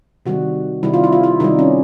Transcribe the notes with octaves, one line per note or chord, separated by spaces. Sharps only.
C3 D#3 G3 F#4
C3 D#3 G3 E4
F4
E4
F4
E4
C3 D#3 G3 D#4
C#4